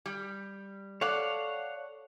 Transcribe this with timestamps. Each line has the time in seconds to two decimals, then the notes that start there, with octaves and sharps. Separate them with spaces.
0.06 G3
1.01 A4 C#5 D5 F5 F#5